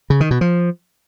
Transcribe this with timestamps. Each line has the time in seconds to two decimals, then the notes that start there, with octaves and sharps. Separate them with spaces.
0.10 C#3
0.20 D#3
0.31 B2
0.41 F3